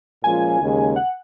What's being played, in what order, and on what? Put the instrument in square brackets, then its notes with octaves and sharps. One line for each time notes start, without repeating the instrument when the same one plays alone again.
[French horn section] A#2 F3 G#3 C#4 F4 [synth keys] G#5
[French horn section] D#2 C#3 G#3
[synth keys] F#5